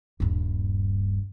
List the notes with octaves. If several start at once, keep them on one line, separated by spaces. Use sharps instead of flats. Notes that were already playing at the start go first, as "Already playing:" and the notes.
D#1 G2